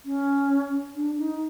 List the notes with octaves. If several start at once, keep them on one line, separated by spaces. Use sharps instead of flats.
C#4
D4
D#4